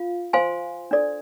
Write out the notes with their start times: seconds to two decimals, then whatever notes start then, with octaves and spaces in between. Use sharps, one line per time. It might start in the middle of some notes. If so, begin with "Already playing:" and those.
Already playing: F4 F5
0.33 C5 F5 G#5 C6
0.91 D4 A4 D5